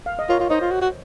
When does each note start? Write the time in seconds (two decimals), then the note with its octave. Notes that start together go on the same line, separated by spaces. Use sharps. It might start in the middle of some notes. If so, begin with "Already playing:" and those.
0.06 F5
0.19 D#5
0.29 F4 A#4 C#5
0.39 F4
0.50 D#4 C5 D#5
0.61 F4
0.71 F#4
0.81 F#4